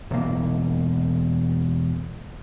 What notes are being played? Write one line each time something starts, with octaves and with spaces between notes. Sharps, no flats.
E1 A#3